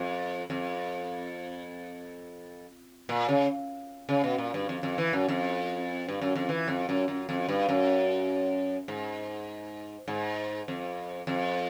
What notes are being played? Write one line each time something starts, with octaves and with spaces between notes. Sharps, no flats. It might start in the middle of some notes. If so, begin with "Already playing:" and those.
Already playing: F2
F2
A#2
C#3
C#3
B2
A#2
G2
F2
F2
E3
F#2
F2
G2
F#2
F2
E3
F2
F#2
F#2
F2
G2
F#2
G#2
G#2
F2
F2